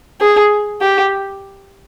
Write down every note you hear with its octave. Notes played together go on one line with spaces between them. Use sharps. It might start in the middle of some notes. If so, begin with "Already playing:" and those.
G#4
G4